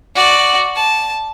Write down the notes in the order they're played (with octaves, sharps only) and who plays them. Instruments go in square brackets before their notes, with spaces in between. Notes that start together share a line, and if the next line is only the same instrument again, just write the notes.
[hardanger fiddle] F#4 D5
A5